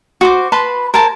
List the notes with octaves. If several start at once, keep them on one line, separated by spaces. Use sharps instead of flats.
F#4 C5 D6
B4 A5 B5 C6
A#4 C5 G#5 A5